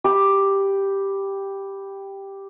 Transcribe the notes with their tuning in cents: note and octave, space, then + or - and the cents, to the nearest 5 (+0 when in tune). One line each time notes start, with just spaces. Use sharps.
G4 +0 B5 +0